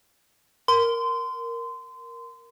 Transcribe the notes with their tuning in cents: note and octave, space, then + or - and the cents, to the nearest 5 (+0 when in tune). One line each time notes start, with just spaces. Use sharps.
A#4 +5 C6 -25